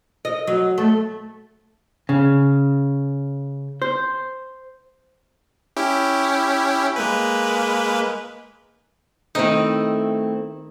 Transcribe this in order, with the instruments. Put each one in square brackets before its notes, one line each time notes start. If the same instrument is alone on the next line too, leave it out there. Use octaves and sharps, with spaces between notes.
[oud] D#5
F#3
A3
[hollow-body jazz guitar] C#3
C5
[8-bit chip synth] C#4 E4 G4
G#3 A#3 B4
[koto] D#3 D#4 [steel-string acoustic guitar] A3 C4 E4